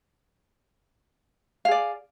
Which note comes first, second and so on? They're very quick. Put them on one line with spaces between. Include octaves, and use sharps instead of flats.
F5 G#4 D5